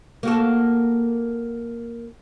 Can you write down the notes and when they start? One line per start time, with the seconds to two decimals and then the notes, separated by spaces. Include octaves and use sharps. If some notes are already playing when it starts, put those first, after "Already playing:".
0.23 A#3 F#4 A4